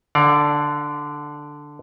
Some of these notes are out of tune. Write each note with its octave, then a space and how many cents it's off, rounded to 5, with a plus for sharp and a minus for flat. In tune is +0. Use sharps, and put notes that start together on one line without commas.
D3 +0 D5 +0 F5 +30